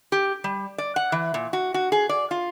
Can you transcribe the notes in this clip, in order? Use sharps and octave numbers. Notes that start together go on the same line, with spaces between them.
G4
G3
D5
F#5
E3
A#2
F#4
F#4
G#4
D5
F4